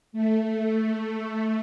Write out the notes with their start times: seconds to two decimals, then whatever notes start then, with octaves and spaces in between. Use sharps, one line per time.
0.13 A3
0.55 A3